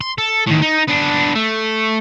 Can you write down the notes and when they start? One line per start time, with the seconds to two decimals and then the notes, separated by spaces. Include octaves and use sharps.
0.01 C6
0.18 A4
0.47 A2 D#3
0.62 D#4
0.88 B3 D4
1.35 A3